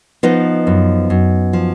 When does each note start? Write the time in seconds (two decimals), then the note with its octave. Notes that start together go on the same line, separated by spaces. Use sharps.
0.23 F3 B3 D#4
0.67 F#2
1.10 F#2
1.53 F3